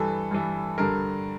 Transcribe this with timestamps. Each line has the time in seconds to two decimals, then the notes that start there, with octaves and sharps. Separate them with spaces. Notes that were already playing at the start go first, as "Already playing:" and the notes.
Already playing: G2 E3 A4
0.31 G2 E3
0.78 G2 D3 A#4